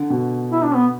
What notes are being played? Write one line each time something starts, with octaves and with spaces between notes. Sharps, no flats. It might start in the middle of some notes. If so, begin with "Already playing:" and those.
Already playing: D3
B2
E4
D4
B3